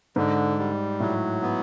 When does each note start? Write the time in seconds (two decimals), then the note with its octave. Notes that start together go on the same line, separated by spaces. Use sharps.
0.16 G#2 D3
0.58 G3
1.00 A2 F#3
1.42 B3